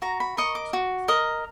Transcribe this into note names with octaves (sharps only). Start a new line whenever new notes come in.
F#4 A#5
B5
A#4 D#5 C#6
D6
F#4
A#4 D#5